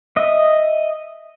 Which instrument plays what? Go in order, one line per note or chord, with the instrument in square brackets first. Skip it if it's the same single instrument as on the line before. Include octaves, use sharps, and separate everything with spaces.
[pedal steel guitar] D#5 E5